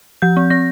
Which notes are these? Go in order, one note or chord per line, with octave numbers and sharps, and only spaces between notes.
F3 G6
C4
C4 A#6